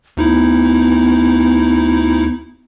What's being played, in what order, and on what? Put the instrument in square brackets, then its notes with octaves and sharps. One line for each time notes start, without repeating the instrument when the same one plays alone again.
[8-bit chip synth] D2 D#4 E4 [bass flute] B3